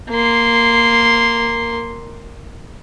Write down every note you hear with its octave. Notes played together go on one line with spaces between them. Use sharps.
A#3 C6